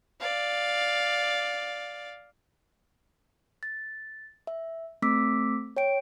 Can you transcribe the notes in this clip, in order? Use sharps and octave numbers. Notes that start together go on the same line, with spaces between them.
D5 F5
A6
E5
A3 C4 D6 E6 B6
C#5 G5 D7